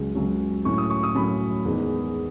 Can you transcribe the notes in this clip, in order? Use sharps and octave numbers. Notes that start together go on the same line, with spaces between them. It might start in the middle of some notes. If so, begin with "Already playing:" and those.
Already playing: C#2 C#3 F#3 C#4
C#2 C#3 F#3 C#4
A2 F#3 C#4 C#6
D#6
C#6
D#6
A2 F#3 C#4 B5
E2 D#3 G#3